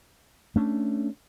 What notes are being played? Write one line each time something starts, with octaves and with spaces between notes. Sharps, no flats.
A3 C#4 D4